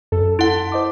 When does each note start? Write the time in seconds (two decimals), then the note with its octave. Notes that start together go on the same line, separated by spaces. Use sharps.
0.12 F#2 A4
0.39 E4 F#5 C6
0.72 C5 D#5 D6